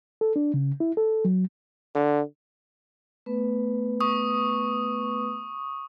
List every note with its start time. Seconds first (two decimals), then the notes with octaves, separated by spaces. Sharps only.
0.21 A4
0.36 D4
0.54 C#3
0.80 E4
0.97 A4
1.25 F#3
1.95 D3
3.26 A3 B3 B4
4.00 C#6 D#6